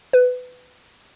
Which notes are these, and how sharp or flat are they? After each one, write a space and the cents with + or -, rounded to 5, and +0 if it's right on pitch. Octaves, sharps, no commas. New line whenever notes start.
B4 +20